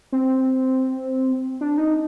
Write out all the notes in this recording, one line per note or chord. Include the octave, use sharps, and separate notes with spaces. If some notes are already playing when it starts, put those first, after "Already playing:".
C4
D4
D#4